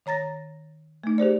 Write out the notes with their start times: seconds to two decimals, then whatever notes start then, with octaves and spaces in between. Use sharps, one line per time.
0.06 D#3 C#5 A#5 A6 A#6
1.04 A3 D#4
1.18 G4 G#4 C5 D5